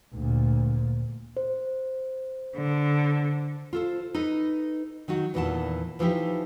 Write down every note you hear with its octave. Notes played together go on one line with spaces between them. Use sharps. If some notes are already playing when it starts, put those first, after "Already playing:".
D2 A#2
C5
D3
F4 A4 C5
D#4 A4 B4 D#5
D#3 F#3 D#4 F#4
E2 A#2 D#3 E3 F#5 A5
E3 F3 D#4 E4 G4